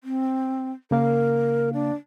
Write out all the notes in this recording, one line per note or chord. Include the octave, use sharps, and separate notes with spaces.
C4
C#3 A#3 A#4 F5
D4